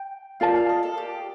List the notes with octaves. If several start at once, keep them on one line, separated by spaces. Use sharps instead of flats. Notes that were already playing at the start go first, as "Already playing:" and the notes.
Already playing: G5
F4 A#4 D5 F5 A5
F5
D#5
A4
G4